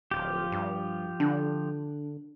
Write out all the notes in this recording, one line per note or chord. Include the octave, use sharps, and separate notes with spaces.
D1 F3 F4 G4
G2
D3 D4